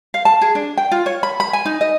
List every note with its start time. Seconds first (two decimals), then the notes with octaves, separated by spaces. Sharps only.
0.14 F5
0.25 A5
0.42 G#4
0.55 D4
0.78 G5
0.92 F4
1.06 C#5
1.23 B5
1.40 B5
1.53 G#5
1.66 D#4
1.81 D#5